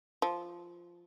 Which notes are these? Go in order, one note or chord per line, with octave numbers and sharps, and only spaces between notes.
F3